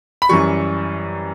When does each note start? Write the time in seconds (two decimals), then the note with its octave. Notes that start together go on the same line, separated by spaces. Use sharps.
0.22 B5
0.29 F#2 E3 G3 C#6